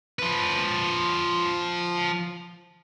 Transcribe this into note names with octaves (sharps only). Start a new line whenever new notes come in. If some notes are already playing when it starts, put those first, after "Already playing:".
F3 B4